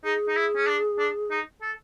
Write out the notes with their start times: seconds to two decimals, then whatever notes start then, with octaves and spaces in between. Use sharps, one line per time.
0.04 D#4 G#4
0.28 D#4
0.36 E4
0.56 C#4
0.67 D4
0.99 D4
1.31 D#4
1.62 A4